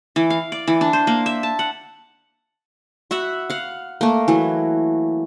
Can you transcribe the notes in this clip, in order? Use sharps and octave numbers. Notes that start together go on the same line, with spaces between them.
E3
F5
D5
E3
D4
C5
A#3
E5
A5
F#5
F#4 E5 F#5 B5
F5 F#5
A3 A#3
E3 F#3